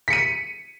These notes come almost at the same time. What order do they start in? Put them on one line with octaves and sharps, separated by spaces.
B6 C#7 D#7